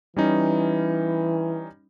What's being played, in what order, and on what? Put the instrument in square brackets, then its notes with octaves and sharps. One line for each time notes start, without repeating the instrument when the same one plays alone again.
[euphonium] E3 [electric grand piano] G3 C#4 D#4